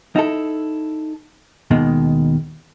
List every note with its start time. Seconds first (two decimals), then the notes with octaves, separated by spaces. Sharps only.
0.16 D#4 E4 A4
1.71 D#2 B2 D#3 G#3